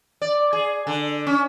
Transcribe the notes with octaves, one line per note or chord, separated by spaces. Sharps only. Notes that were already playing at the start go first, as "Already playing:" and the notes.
D5
G#4
D3
C#4